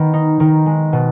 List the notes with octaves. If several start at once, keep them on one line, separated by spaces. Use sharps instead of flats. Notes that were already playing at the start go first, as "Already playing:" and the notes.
Already playing: D#3 B3
D#4
D#3
G#3
B2